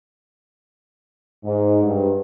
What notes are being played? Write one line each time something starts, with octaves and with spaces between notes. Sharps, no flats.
G#2
G2